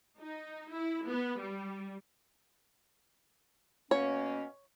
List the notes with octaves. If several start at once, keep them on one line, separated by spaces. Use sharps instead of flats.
D#4
E4
B3
G3
B2 A#3 C#4 C#5